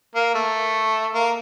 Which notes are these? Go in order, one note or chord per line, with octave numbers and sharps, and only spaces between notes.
A#3
A3
A#3